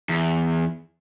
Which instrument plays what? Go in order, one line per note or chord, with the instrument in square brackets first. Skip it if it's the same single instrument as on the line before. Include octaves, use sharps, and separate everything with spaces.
[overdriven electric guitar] E2